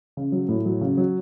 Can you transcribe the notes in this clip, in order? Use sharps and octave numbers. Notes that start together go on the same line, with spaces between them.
C#3
F#3
A2
F#3
C#3
F#3